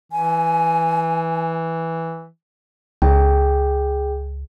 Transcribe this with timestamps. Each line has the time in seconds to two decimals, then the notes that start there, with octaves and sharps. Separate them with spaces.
0.12 E3 G#5
3.02 C#2 G#4 G5